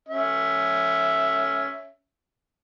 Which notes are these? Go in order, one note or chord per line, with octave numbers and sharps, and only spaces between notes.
C#4 E5